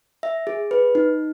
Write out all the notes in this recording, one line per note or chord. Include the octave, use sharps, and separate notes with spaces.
E5
G#4
B4
D#4